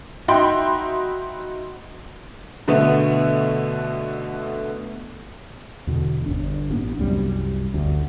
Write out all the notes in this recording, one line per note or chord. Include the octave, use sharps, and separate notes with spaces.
D#4 F#4 E5 G5 B5 C6
B2 D3 A3 B3
E2 B2 D3
G1 D4
A1 A#3 B3 D4
C2 F#2 G3
F#1 D2